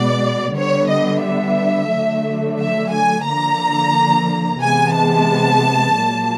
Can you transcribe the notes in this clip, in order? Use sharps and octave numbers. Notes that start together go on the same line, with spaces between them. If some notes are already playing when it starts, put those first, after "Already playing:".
Already playing: B2 G#3 B3 D5
D3 G3 B3 C#5
D#5
E5
D3 F#3 A3
E5
G#5
D3 F3 A#3 A#5
C3 E3 G#3 B3 G#5
A5
A#2 F#3 A#3